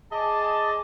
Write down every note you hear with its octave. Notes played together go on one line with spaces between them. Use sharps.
G#4 D5 D#5 G#5 A5